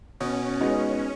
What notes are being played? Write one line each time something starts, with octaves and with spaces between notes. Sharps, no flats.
B2 C#4
G#3 B3 D#4 F#4